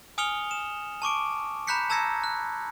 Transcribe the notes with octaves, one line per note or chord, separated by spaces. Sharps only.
G#5 D#6 F6 C#7 F7 G7
E7
A5 C#6 D6 D7
A#5 B5 F#6 G6 B6 C#7
A5 A#5 E6 G#6 A#6 C#7
F#6